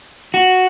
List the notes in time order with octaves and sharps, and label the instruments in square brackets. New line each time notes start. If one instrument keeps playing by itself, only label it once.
[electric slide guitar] F#4